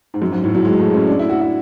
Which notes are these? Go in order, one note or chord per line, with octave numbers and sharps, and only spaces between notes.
G#2
F#2
G#2
A2
F#3
G#3
A3
C#4
D4
E4
F#4
E4